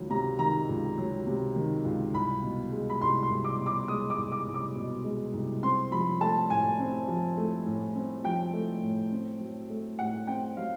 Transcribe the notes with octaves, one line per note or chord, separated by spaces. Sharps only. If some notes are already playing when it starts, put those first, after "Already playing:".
Already playing: C#2 D#3 F#3
C3 A#5
D#3 A#5
C#2
F#3
C3
D#3
C#2
C2 B5
B2
G#3
B5
C2 C6
C6
C2
D6
B2
D6
G#3 D#6
D6
C2
D6
C2
D6
B2
G#3
C2
C4 C6
F3 B5
A3 A5
A2 G#5
C4
F3
A3
A2
C4
F3 G5
A3
A2
C4
F#3
A3
A2 F#5
C4 G5
F#3 F5